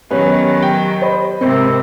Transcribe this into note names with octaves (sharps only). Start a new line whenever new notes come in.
D#3 F#3 B3 C#4 G4 B4
G5
C5 D#5 B5
G#2 C3 C4 A#4 E6